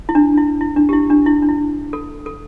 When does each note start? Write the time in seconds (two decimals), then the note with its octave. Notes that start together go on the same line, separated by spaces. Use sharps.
0.09 E4
0.15 D4
0.38 E4
0.61 E4
0.76 D4
0.89 G4
0.93 E4
1.10 D4
1.26 E4
1.42 D4
1.49 E4
1.93 A4
2.26 A4